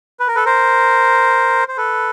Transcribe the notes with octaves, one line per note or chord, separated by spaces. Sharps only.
B4
A#4
A4 B4
A#4 C5
C5
A4 B4